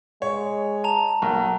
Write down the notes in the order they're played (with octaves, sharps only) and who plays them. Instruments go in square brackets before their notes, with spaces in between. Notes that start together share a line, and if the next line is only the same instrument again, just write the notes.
[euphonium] G#3 [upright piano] C#5
[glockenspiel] A5 A#5 F7
[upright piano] B1 [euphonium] A#3